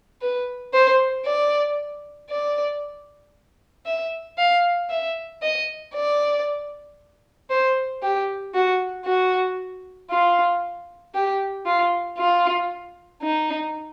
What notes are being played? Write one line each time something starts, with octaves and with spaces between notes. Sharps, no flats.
B4
C5
D5
D5
E5
F5
E5
D#5
D5
C5
G4
F#4
F#4
F4
G4
F4
F4
D#4